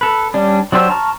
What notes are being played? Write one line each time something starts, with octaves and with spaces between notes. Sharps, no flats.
A4 B4
G3 C#4 D4
F#3 D4 G4 C5 E6
A5 A#5 C#6 F6